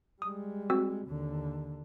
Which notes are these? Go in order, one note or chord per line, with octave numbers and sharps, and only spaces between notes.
G3 G#3 D#6
C4 F#4 E6
D#2 D3